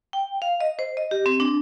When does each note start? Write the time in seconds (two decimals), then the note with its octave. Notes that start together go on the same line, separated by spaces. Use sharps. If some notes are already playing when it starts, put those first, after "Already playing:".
0.13 G5
0.42 F5
0.60 D#5
0.79 C5
0.97 D#5
1.11 G4
1.26 C4
1.40 D4